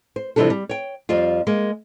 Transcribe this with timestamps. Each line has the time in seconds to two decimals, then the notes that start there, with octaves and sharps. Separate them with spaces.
0.16 C5
0.36 C3 E3 F3 G3 D4 A4
0.50 G3
0.69 C#5 G5
1.09 F2 F3 G3 F4
1.47 G#3 A#3